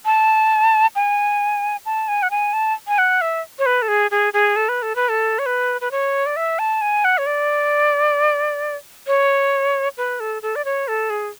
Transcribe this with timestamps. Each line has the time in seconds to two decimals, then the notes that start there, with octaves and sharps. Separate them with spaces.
0.05 A5
0.95 G#5
1.86 A5
2.08 G#5
2.23 F#5
2.31 G#5
2.53 A5
2.88 G#5
2.98 F#5
3.21 E5
3.59 C#5
3.66 B4
3.82 A4
3.88 G#4
4.11 G#4
4.33 G#4
4.56 A4
4.69 B4
4.82 A4
4.96 B4
5.09 A4
5.39 C#5
5.46 B4
5.81 B4
5.91 C#5
6.26 D5
6.36 E5
6.59 A5
6.81 G#5
7.04 F#5
7.18 C#5
7.26 D5
9.07 C#5
9.97 B4
10.20 A4
10.42 A4
10.56 D5
10.65 C#5
10.88 A4
11.10 G#4